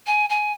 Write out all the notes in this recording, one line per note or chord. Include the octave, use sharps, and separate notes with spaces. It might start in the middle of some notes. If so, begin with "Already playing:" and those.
G#5
G#5